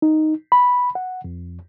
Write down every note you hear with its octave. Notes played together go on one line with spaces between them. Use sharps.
D#4
B5
F#5
F2